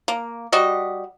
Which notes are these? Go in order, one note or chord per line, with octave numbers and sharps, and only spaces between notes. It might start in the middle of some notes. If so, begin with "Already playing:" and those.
A#3
G3 F#4 D#5